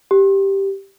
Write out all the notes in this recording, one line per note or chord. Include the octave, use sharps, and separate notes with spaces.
G4